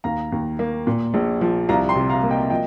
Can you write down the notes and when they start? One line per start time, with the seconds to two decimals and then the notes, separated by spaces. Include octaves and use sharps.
0.04 D#2 F5 A#5
0.32 D#2
0.59 A#3
0.87 A#2
1.14 A#1
1.41 F3
1.69 C2 F5 A#5
1.89 G5 C6
1.95 C3
2.09 F5 A#5
2.23 A#3
2.30 D#5 G5
2.50 F3 D#5 G5